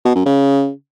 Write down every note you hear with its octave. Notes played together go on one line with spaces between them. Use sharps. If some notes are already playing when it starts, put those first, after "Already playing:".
B2
F#2
C#3